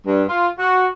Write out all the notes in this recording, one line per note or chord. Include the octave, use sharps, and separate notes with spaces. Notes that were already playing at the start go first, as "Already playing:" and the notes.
G2
F4
F#4